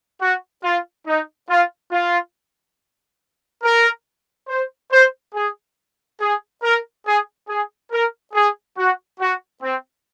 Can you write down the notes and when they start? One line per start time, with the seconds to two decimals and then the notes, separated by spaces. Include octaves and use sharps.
0.20 F#4
0.63 F4
1.06 D#4
1.49 F4
1.91 F4
3.63 A#4
4.48 C5
4.91 C5
5.34 G#4
6.20 G#4
6.63 A#4
7.06 G#4
7.48 G#4
7.91 A#4
8.33 G#4
8.77 F#4
9.20 F#4
9.61 C4